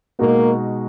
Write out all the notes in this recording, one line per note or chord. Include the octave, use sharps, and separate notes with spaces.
B2 G#3 A#3 D#4 F#4